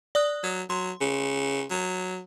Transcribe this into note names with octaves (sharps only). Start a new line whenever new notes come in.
D5 D#6 F#6
F#3
F#3 C6
C#3
F#3